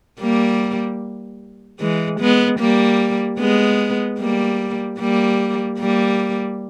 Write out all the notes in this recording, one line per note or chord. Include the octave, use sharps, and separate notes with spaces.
G3 A#3
E3 G#3
G#3 B3
G3 A#3
G#3 B3
G3 A#3
G3 A#3
G3 A#3